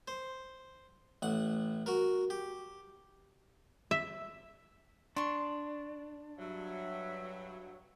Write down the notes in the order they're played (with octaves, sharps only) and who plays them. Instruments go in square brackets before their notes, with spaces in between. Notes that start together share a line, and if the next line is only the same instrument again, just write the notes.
[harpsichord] C5
A1 F#5
F#4 A#4
G4
[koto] E5
[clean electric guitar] D4 [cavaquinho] C6 C#6
[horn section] G2 F#3 [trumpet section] E5